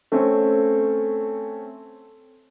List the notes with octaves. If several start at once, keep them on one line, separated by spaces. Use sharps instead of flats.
A3 C4 C#4